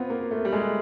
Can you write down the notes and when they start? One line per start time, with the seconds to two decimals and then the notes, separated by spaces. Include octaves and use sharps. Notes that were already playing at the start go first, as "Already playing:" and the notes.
Already playing: B3 C4 F4
0.10 A#3
0.31 A3
0.45 G3
0.53 G#3